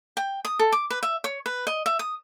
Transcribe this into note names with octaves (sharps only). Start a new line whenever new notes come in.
G5
D#6
A4
D6
B4
E5
C#5
B4
D#5
E5
D#6